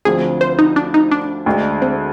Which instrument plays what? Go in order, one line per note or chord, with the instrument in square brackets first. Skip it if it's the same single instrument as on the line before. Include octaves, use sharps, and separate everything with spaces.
[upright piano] D2 D3 F3 C4 [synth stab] G#4
[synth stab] C5
D#4
D4
D#4
D4
[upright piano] D2 D3 G#3 D4
[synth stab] C4